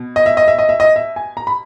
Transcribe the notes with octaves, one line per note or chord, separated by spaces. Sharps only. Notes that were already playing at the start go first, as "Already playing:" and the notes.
Already playing: B2
D#5
E5
D#5
E5
D#5
E5
D#5
E5
G#5
A#5
B5